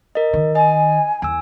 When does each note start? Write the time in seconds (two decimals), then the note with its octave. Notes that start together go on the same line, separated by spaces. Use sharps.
0.15 A#4 D#5
0.33 D#3
0.55 D#5 G#5
1.22 E2 G#5 E6